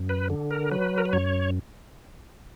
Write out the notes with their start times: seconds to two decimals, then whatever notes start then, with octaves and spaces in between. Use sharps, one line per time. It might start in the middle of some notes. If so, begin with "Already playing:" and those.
Already playing: F#2
0.09 B4
0.30 D3
0.51 A#4
0.71 F#3 B4
0.98 A#4
1.05 B4
1.13 F#2 C#5